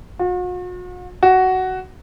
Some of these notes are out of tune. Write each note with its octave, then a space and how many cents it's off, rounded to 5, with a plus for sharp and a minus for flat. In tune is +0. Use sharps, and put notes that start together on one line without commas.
F#4 -45
F#4 +10